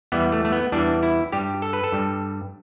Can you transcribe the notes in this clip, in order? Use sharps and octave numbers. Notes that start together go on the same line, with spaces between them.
E2 E3 G3 B3
A3
A3
B3
E2 E3 G3 D4
E4
G2 G3 G4
A4
B4
A4
G2 G3